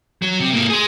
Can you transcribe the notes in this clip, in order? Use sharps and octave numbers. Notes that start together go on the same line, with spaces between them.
F#3
C3
G#2 A#3
G#4 C6